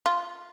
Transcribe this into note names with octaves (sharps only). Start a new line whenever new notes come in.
F4